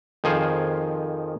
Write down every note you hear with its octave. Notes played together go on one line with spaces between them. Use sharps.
F2 D#3 F3 G#4 C5 F5